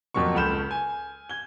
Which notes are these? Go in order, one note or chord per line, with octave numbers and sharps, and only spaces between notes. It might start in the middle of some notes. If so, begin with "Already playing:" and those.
F2 A#2 F#3 A#3 C#6
C#2 A4 B5 F6 G6 E7
G#5
G#6 G7